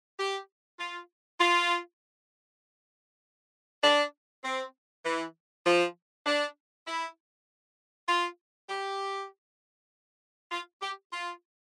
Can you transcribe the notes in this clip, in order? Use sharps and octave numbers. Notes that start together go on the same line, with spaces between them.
G4
F4
F4
D4
C4
E3
F3
D4
E4
F4
G4
F4
G4
F4